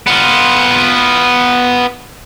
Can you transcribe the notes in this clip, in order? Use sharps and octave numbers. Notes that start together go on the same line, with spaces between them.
B3 F4